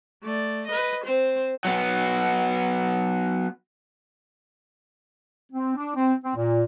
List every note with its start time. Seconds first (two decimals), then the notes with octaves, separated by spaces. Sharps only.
0.23 A3 D5
0.67 B4 D#5
1.04 C4 C5
1.65 F#3 B3
5.52 C4
5.77 D4
5.96 C4
6.23 C4
6.36 A#2